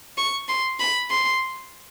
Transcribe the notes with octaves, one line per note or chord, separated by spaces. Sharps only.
C#6
C6
B5
C6